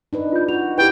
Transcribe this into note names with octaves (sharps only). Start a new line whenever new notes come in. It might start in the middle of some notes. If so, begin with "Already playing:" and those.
D4 D#4 B4
F4 G6
F#4 F7
E4 G4 B4 G5